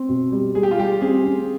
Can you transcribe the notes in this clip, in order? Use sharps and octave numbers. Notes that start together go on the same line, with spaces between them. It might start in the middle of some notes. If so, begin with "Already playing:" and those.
Already playing: C4
B2
G3
G3 G#4
G4
F4
G3 G4
C4 G#4
C4